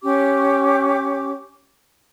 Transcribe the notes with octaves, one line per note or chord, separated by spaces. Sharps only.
C#4 G4 D6